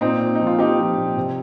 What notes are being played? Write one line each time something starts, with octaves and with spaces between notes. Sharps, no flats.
A#2 C4 D#4
A#2
F3 D#4
F4
F3 D#4 G4
F3
A#2
C3